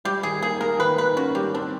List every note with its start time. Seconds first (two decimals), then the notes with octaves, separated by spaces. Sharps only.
0.05 G3 G4
0.23 D#3 G#4
0.42 A#3 G#4
0.60 A#3 A#4
0.79 D#3 B4
0.98 D#3 B4
1.16 C#4 F#4
1.35 G3 G4
1.54 C4 D4